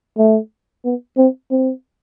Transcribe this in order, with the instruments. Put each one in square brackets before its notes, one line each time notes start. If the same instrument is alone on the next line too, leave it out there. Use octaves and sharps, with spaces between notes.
[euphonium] A3
B3
C4
C4